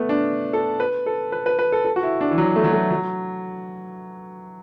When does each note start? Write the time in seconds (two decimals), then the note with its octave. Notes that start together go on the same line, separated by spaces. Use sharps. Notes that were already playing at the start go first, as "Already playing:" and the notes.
Already playing: A3 B3
0.09 D4
0.53 A4
0.80 B4
1.06 A4
1.32 B4
1.46 B4
1.59 B4
1.72 A4
1.85 A4
1.96 F#4
2.03 E4
2.21 D4
2.31 E3
2.38 F#3
2.56 A3
2.64 F#3
2.72 A3
2.90 F#3